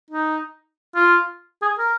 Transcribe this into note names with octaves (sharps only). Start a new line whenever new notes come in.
D#4
F4
G#4
A#4